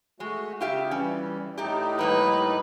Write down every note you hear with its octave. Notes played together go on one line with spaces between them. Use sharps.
G#3 A3 F#4
C#3 F4 G4 E5
E3 G3 C#4
A2 A3 D#4 G4
F3 G3 A#3 B4